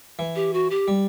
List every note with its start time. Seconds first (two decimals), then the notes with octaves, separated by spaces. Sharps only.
0.19 E3
0.36 G4
0.53 F#4
0.70 G4
0.88 G3